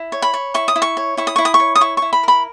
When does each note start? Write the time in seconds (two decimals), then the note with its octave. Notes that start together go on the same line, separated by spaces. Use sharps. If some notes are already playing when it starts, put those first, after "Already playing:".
Already playing: E4
0.12 C#5
0.22 B5
0.34 C#5
0.54 E4 C#6
0.68 D#6
0.76 E4
0.82 C#6
0.97 C#5
1.17 E4 C#6
1.27 D#6
1.36 E4 C#6
1.45 D#6
1.54 C#6
1.60 C#5
1.75 D#6
1.81 E4 C#6
1.97 E4 C#6
2.13 B5
2.23 A#4 B5